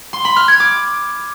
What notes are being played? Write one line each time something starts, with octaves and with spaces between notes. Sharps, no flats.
C6
B5
F6
G#6
D6